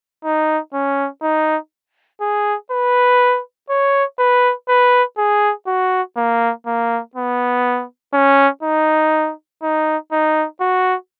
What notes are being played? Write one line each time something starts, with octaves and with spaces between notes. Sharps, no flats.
D#4
C#4
D#4
G#4
B4
C#5
B4
B4
G#4
F#4
A#3
A#3
B3
C#4
D#4
D#4
D#4
F#4